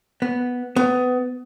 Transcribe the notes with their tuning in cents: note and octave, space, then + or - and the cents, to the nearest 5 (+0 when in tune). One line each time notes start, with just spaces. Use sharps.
B3 +0
B3 +25